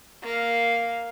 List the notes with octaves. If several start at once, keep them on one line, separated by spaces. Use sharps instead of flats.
A#3 F5